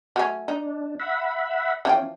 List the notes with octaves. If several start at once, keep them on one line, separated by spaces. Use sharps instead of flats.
F#3 A3 C#4
D4 D#4
E5 F#5 B5
E3 F3 C#4 G5